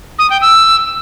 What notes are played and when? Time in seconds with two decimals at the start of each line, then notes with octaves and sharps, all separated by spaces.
0.19 D#6
0.30 G5
0.42 E6